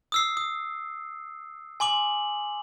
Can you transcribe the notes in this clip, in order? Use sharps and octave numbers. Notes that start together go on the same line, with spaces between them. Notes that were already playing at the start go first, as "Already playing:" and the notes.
D#6 E6 C7
D#6
G#5 C6 D6 F#7